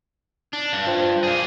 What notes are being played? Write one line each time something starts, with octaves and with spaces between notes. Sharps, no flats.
D4
G2
F4 C5 G5
A#3 G#4